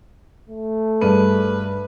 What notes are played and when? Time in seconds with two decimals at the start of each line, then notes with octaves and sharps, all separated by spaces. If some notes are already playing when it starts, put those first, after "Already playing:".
0.50 A3
1.01 G2 G#4 B4 D#7